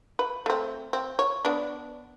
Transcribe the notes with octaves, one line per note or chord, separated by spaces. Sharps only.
B4
A3 C4
C4
C#5
B3 D4